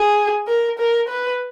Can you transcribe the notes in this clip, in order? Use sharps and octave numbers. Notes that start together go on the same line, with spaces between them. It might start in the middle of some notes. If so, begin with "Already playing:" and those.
Already playing: G#4
A#4
A#4
B4